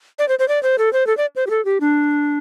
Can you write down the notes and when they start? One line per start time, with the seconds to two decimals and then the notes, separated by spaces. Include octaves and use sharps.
0.19 D5
0.29 C5
0.39 C5
0.48 D5
0.63 C5
0.78 A4
0.93 C5
1.07 A4
1.17 D5
1.36 C5
1.47 G4
1.50 A4
1.65 G4
1.81 D4